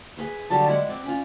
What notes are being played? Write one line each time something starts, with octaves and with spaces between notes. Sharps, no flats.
G#4 B4 C6
D3 F#3 G3 A5
G#3 E4 F#5
C4 D5
C#4 F4 B5